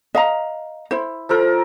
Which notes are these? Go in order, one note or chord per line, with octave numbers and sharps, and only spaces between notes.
D#5 F5 A#5
E4 C5
F3 A4 A#4